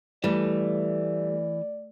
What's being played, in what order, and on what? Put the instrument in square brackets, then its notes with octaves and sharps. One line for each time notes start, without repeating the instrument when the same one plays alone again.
[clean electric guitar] E3 [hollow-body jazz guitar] G3 [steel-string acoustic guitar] A3 [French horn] D5